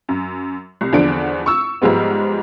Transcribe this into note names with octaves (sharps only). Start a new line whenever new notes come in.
F#2
C2
E2 D3 F3 D4 D7
C#6 E6
G#2 F3 G3 G#3 B3